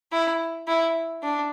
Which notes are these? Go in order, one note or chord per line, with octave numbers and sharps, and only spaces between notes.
E4
E4
D4